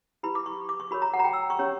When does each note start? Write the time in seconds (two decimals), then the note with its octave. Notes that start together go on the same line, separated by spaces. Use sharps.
0.23 E4 G4 B4 B5
0.35 D6
0.46 C#6
0.69 D6
0.80 C#6
0.91 F#4 A#4 C#5 B5
1.02 A#5
1.14 F#5
1.19 A#5
1.24 G5
1.33 E6
1.50 C#6
1.59 C#4 G4 C#5